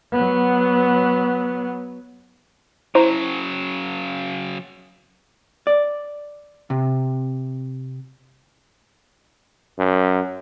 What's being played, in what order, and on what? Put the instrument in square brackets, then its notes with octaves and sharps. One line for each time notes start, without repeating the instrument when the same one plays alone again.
[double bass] F#3 B3
[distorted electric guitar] C#3 F#3 [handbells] E4 A#5 [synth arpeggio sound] C5
[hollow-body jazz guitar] D5
C3
[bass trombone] F#2